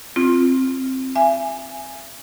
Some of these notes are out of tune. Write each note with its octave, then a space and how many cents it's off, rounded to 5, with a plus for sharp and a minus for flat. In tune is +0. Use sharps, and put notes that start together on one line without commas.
C4 +10 F4 -15
E5 +40 G#5 +0